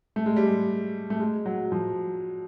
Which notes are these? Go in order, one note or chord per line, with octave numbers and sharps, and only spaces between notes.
A3
G#3
G3
G#3
A3
G#3
F#3
F3